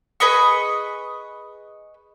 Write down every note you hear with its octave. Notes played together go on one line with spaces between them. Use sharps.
G#4 B4 D#5 C#6